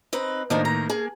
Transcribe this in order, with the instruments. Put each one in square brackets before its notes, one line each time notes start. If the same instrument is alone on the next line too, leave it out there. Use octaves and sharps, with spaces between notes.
[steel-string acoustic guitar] C4 D#4 B4
[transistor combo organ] A2 D#3 A#3 [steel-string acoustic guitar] F3 D4 D#4
[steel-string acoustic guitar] A#5
[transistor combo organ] A#3 [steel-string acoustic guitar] G#4